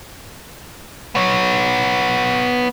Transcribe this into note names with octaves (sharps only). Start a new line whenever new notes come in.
B3 C#5